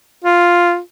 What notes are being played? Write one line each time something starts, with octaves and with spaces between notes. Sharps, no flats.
F4